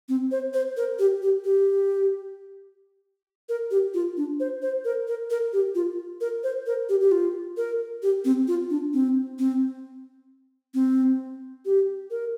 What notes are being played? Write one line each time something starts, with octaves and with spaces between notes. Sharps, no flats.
C4
C5
C5
A#4
G4
G4
G4
A#4
G4
F4
D4
C5
C5
A#4
A#4
A#4
G4
F4
A#4
C5
A#4
G4
G4
F4
A#4
G4
C4
F4
D4
C4
C4
C4
G4
A#4